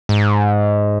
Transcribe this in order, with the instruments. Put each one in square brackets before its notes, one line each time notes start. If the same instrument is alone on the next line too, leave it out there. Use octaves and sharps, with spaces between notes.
[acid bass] G#2